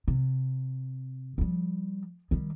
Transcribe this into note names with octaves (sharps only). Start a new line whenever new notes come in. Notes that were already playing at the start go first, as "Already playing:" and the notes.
C3
F3 G3
D#3 G3